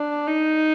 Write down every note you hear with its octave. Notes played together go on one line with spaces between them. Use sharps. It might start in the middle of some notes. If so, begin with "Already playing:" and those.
Already playing: D4
D#4